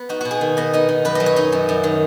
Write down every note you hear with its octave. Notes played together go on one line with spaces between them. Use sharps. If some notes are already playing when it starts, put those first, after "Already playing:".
Already playing: B3 B4
D#4 F#4
B2 F#4
G#4
D#3
B3 D#5
D#4 D#5
D#3
F#2 B4
F#3 D#5
C#5
D#4 D#5
F#2
F#2
D#3